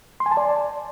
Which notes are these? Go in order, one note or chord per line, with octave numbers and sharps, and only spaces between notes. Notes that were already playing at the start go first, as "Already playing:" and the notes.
C6
G#5
A5
D5